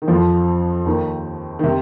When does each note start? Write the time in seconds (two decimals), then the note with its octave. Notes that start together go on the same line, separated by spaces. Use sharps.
0.02 D#3
0.08 F2 F3
0.86 D#2 D#3
1.59 D#3
1.64 C3